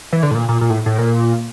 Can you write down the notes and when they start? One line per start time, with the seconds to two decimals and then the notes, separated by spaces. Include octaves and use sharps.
0.13 E3
0.23 D3
0.31 A2
0.35 A#2
0.49 A#2
0.61 A#2
0.70 A2
0.86 A2
0.99 A#2